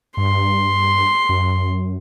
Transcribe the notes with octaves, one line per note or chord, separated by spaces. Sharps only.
G2 C6
F#2